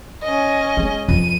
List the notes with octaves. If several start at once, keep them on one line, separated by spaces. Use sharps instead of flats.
C#4 D#5
G#3
F2 D#7